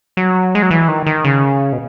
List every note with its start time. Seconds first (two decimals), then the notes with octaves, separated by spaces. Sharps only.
0.17 F#3
0.55 G#3
0.62 F#3
0.71 E3
0.88 D#3
1.07 D#3
1.25 C#3
1.73 B2